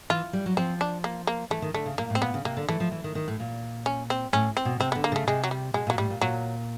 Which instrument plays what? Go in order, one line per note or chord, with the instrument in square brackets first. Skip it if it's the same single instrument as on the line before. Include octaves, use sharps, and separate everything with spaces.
[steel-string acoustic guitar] E3 [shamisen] F4
[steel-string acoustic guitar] G3
F#3
[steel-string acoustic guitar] F3 [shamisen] C4
[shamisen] D4
A#3
A#3
[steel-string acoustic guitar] E3 [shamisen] A3
[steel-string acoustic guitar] D#3
[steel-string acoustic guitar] D3 [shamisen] A3
[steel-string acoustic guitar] C#3
[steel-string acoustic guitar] A#2 [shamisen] A#3
[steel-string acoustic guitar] A2
[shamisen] C4
[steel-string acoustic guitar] A#2 [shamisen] B3
[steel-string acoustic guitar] C#3
[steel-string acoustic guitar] C3 [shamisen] A#3
[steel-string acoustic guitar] D3
[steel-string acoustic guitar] E3 [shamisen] A3
[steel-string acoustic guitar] F3
E3
D#3
D#3
A2
A#2
[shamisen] C#4
C4
[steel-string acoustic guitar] A2 [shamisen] C#4
[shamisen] C4
[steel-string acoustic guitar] B2
[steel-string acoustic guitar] C3 [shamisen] C4
[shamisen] B3
[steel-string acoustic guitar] D3
[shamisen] A#3
[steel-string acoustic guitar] C#3 [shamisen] A3
[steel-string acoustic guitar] C3 [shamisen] G#3
[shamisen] F#3
G3
[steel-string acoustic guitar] B2 [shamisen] G#3
[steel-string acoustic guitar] A#2 [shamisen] F#3
[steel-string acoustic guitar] A2 [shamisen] G3
[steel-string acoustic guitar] A#2
[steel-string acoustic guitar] A#2 [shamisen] F#3